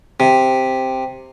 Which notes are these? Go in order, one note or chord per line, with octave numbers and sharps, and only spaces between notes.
C3